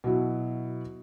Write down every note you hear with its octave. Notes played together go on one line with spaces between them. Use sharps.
B2 F#3 E4